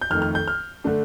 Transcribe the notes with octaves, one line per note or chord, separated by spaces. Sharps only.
G6
F2 D#3 A3 F6
F6
G6
F6
D3 A3 D4